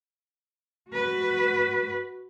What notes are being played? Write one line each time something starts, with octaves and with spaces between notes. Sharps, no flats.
F#4 B4